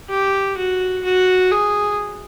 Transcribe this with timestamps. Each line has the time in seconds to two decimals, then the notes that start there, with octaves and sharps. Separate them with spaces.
0.10 G4
0.57 F#4
1.05 F#4
1.51 G#4